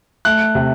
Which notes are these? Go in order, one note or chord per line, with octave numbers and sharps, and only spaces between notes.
A3 F#6
C3